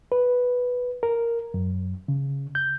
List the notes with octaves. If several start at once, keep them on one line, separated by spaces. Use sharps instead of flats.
B4
A#4
F#2
C#3
G6